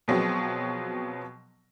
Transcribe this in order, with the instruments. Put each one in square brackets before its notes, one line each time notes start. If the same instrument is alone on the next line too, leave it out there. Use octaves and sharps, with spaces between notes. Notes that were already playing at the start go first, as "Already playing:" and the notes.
[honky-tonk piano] B2 F3 F#3 G#3 B3 C4